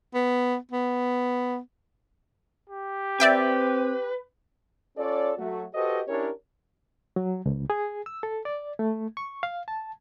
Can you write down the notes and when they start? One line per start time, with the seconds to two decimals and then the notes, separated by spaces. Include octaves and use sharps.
0.14 B3
0.71 B3
2.70 G4
3.20 C4 B4 D5 E5 G5
4.98 C#4 F4 A4 C#5 D5
5.38 F#3 A3 F#4
5.74 F#4 G4 A4 B4 C5 D#5
6.08 C#4 D4 E4 G4 A#4 C#5
7.16 F#3
7.46 C#2
7.70 G#4
8.06 E6
8.23 A4
8.45 D5
8.79 A3
9.17 C#6
9.43 F5
9.68 A5